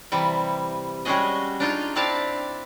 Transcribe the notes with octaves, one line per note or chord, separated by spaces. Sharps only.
C3 E3 G3
G3 G#3 C#4 F#4 G#4 D#5
D4 D#4 F4
C4 D4 E4 D5 F5 A5